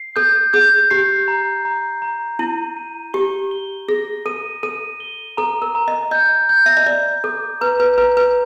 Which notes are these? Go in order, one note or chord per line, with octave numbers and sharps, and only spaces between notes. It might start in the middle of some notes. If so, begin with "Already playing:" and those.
Already playing: C7
A4 G6
G#4 G6
G4 C7
A#5
A#5
A#5
E4 D#7
D#7
G4 G7
G7
G#4 A#6
A4 D#7
A4 D#7
G7
A4 A#5
A#4
A#5
D#5
D#5 G6
G6
E5
D#5
D5 G6
A4 D6
B4 A#5
B4
B4 A#5
B4